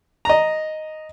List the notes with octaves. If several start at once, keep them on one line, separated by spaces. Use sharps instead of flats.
D#5 A#5